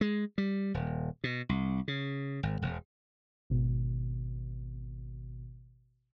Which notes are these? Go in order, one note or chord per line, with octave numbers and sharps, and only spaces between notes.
G#3
G3
D#1
B2
C2
C#3
G#1
E1
G#1 B2